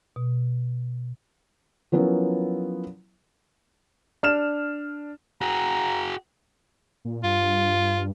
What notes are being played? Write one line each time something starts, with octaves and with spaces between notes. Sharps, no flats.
B2
F3 F#3 B3 C#4 E4 A#4
D4 F6 E7
F#4 G#4 A#5
A#2
G2 F4